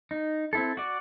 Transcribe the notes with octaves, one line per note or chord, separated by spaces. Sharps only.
D#4
C4 E4 A4
F#4 D5